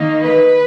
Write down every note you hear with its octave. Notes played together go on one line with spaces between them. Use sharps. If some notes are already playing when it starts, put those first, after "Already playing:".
Already playing: D#3 A#3 D#4
B4